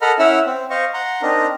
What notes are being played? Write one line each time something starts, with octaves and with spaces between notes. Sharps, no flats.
A4 A#4 D#5 F#5 B5 F6
C#4 E4 E5 F#5 E6 F6
C4
C5 D#5 F5 C#6
F#5 A#5 C6
C4 D4 D#4 A#4 D#5